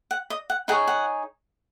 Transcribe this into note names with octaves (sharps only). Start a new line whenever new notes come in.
F#5
D#5
F#5
D#4 G#4 C#5 F#5
F#5